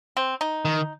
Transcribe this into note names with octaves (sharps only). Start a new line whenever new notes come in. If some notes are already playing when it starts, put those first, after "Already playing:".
C4
D#4
D#3